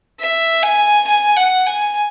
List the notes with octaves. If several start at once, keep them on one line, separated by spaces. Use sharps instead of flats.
E5
G#5
G#5
F#5
G#5